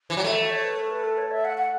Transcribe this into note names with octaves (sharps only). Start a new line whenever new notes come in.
E3
F#3
A3 E5
E5
C#5
B4
A4
B4
A4
C#5
E5
F#5
F#5